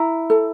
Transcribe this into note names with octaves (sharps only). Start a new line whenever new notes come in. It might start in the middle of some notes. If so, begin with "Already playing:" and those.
Already playing: E4 A#5
A4